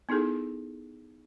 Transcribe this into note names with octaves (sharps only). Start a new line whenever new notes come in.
B3 D#4 E4 G#4 A4